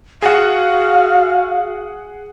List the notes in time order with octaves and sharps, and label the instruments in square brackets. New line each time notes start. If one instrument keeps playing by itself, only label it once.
[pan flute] F#4 [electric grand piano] G#4 F#5 [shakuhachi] F5